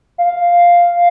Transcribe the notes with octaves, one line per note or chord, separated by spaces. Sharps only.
F5